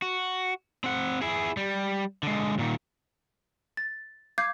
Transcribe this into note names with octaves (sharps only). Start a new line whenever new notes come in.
F#4
C4 F#5
E4 G#4
G3
D3 G#3
A#2 D#3
A6
F5 D6 G6 G#6 C7